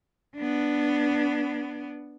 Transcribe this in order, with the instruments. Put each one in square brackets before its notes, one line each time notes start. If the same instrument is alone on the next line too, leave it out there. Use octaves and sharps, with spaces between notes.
[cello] B3 D4